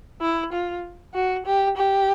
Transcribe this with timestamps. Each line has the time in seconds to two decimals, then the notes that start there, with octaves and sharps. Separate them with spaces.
0.22 E4
0.53 F4
1.14 F#4
1.46 G4
1.77 G4